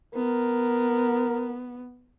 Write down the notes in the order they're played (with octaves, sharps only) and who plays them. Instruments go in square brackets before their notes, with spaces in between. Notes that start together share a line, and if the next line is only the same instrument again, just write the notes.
[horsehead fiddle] B3 [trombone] A#4